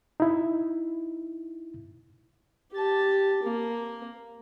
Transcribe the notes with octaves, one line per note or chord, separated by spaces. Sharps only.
D#4 E4
G4 A5
A#3